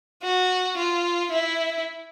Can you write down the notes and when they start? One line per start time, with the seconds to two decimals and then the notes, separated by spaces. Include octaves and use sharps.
0.23 F#4
0.77 F4
1.31 E4